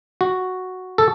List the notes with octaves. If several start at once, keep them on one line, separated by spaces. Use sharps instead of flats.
F#4
A4